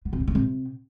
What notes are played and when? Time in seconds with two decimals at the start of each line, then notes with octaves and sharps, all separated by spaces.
0.05 B3
0.13 C3
0.20 A#3
0.28 A3
0.35 C3